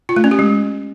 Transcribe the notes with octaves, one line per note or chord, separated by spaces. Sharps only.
F4
A3
C#4
G4
G#3